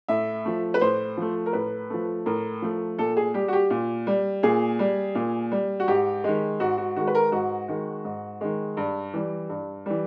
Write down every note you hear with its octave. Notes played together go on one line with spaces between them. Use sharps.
A2 E5
F3 A3
B4
A2 C5
F3 A3
A#4
A2 B4
F3 A3
A2 A#4
F3 A3
A#2 A4
G#4
G3 G4
F#4
G4
A#2
G3
A#2 G#4
G3
A#2
G3
F#4
G#2 G4
D#3 G#3
G#2 F#4
F#4
D#3 G#3 F#4
B4
A#4
G#2 F#4
D#3 G#3
G#2
D#3 G#3
G2
E3 G3
G2
E3 G3